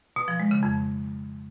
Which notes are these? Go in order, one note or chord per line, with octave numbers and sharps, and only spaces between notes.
B2
F3
G#3
C#3
F2